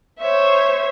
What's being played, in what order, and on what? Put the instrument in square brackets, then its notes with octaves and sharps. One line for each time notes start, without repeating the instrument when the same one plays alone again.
[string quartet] C5 C#5 E5